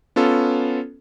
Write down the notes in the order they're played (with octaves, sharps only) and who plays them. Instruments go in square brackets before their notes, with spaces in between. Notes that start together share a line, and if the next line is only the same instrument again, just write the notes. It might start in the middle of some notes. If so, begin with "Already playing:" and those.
[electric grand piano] B3 C#4 F4 A4